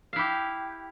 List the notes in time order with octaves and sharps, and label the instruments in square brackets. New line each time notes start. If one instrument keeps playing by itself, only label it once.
[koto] F5
E4
G4